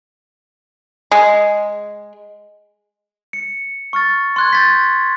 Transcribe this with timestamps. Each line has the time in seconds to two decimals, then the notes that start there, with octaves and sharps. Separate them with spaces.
1.11 G#3
3.33 C#7
3.93 C#6 F6 A6
4.36 C6 F#6 G#6
4.53 G6 A6 B6